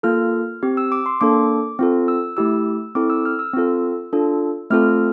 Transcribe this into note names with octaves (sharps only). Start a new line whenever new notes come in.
A#3 F4 A4 F6
C4 G4
E6
D6
C6
A#3 D4 A4 D6
C4 F4 A4
E6
A3 E4 G4 E6
C4 E4 A4 D6
E6
F6
E6
C4 F4 A4
D4 F4 A4
A3 C4 F4 A4 F6